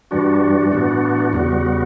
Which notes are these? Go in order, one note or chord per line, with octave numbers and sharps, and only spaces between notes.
G2 E3 G3 D4 F#4
A2 E3 B3 D4 F#4
E2 C#3 G3 B3 F#4